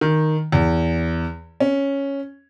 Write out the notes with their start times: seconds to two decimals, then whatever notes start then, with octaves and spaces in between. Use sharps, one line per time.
0.01 D#3
0.52 E2
1.60 C#4